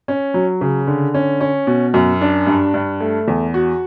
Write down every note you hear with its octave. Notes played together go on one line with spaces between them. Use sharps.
C#4
F#3
C#3
D3
C#4
C#4
B2
F#2
D4
G2
G2
A3
E2
F#4